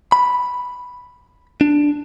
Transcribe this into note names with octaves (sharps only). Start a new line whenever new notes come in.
B5
D4